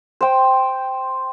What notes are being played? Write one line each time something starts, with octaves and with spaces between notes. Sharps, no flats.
C5 G5